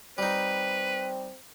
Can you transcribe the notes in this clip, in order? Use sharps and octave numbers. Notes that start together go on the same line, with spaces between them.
G3 C4 D#4 B4